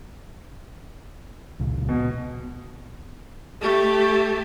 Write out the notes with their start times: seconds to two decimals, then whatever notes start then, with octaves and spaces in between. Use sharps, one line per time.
1.59 C#2 A#2 C#3
1.89 B2
3.61 A3 G4